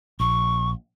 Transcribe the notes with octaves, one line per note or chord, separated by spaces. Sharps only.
A#1 C#6